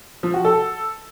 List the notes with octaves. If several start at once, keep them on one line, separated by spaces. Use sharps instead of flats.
F3
F#4
A4